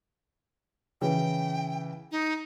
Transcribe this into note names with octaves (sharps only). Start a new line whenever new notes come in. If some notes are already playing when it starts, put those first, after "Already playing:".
C#3 E3 G5
D#4